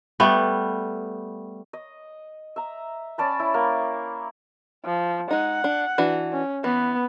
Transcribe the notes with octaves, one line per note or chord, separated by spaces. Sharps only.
G3 A3 B3
D#5
E5 A#5
C#4 D5 A5 B5
E4
A#3
F3
G#3 D#4 F#5
D4
E3 D4 F#4
C#4
E3 B3